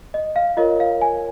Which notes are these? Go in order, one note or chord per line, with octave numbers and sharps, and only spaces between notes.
D#5
F5
F4 A#4 C#5 D#5
F5
G#5